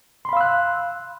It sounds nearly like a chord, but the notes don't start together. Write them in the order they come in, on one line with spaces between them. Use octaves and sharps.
C6 B5 F5 E6 F#6